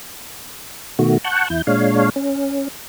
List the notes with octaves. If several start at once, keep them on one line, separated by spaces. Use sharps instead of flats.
B2 D#3 A3 F#4
F#5 A5 C#6 F#6 G6
E2 E4 G6
A#2 G#3 D4 C#5 F5
C#4